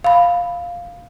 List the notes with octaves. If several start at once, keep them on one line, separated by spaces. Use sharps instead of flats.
F5 B5